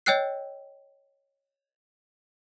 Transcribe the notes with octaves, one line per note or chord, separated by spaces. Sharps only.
C#5 D#5 G5 E6 F#6 C7